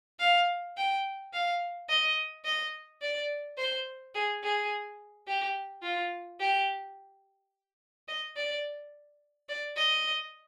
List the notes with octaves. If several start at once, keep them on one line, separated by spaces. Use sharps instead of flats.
F5
G5
F5
D#5
D#5
D5
C5
G#4
G#4
G4
F4
G4
D#5
D5
D5
D#5